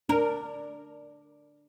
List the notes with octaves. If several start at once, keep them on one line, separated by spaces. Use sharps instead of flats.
D4 A#4